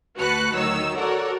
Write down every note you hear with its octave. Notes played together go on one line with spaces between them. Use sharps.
D2 F#4 B4 A5 F#6 C#7
D2 D#3 F#3 D#4 C#5 E6
F#4 A4 A#4 C#5 D5 F#5